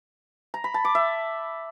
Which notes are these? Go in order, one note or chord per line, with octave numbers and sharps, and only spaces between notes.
A#5
B5
A5
D6
E5